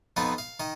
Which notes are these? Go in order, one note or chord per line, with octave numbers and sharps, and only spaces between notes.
F2 F3 B3 D#4 D#5
F5
D#3 D#5